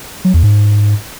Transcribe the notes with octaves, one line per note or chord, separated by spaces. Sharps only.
F#3
E2
G#2